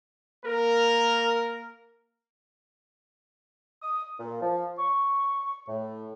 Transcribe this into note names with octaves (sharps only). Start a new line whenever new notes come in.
A#3 A#4
D#6
A#2
F3
C#6
A2